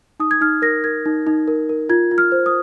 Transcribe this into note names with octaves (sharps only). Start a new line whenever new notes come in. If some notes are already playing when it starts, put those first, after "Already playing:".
D#4 D#6
G#6
D#4 F6
A#4 A#6
A#4 G#6
D#4
D#4
A#4
A#4
F4 G#6
F4
F6
C5
D#6